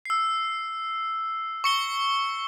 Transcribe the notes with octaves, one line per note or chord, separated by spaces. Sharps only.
E6 C7
C#6 C#7 G7